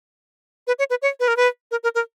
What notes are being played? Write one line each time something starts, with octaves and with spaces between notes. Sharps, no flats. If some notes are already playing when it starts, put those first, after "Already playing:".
B4
C#5
B4
C#5
B4
A#4
B4
A#4
A#4
A#4